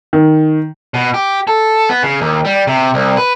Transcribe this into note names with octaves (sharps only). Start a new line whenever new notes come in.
D#3
B2
G4
A4
B3
C#3
D#2
G3
C3
C2
B4